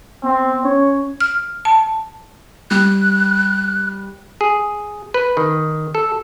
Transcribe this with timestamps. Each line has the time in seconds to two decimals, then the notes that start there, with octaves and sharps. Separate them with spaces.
0.23 B3 C4
0.64 C#4 C#5
1.21 F6
1.65 A5
2.71 G3 F#6
4.41 G#4
5.14 B4
5.37 D#3
5.95 A4